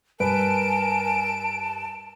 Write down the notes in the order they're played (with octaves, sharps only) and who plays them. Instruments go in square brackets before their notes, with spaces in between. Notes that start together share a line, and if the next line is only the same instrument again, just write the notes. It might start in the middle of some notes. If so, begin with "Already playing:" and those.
[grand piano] G2 B4 [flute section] A#4 G#5 [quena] A5 [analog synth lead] D7